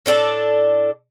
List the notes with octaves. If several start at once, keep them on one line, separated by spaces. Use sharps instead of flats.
A2 D4 A4 D5